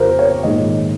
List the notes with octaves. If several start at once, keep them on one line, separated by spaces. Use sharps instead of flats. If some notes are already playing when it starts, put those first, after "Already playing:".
Already playing: F2 C#3 F4 G4 A#4 C5
C#5
A#1 G#2 D#3 D#5